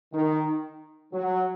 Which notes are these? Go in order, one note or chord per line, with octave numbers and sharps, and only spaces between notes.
D#3
F#3